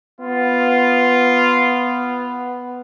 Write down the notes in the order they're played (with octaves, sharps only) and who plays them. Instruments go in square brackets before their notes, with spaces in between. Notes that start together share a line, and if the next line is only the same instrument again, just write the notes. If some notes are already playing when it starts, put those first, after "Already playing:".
[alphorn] B3 [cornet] F4